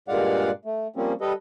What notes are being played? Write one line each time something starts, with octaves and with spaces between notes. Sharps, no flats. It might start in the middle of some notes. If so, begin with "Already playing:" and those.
G2 A#2 G#3 D5 F5 F#5
A3
F3 G3 A#3 C4 C#4
G3 G4 A4 B4 D#5